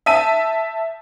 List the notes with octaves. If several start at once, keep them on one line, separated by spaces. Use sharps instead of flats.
E5 A5 D#7